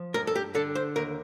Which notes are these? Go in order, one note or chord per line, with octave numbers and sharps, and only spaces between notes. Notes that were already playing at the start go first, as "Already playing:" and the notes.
Already playing: F3
G2 A#4
A4
G4
D3 A4
C5
D#2 A#4